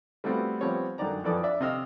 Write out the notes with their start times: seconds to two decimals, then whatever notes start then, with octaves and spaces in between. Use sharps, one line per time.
0.24 G3 A3 B3 C4 F4 F#4
0.61 F3 G3 B3 C4 C#5
0.98 F#2 D3 D#3 D5 A#5
1.24 F2 E3 A4 D5 D6 D#6
1.43 D4 D5 E5
1.60 C3 D#5 F5 E6